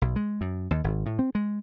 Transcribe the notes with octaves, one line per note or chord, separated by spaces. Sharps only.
B1
G#3
F#2
D#2
G#1
A2
C4
G#3